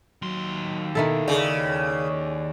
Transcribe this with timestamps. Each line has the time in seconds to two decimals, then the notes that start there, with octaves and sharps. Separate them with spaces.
0.22 D#2 F#3 C6
0.95 B2 D#3 E4 A4
1.28 C#3 D5